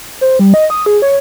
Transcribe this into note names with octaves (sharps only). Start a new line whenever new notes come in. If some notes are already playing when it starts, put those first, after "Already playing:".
C5
G3
D#5
D#6
G#4
C#5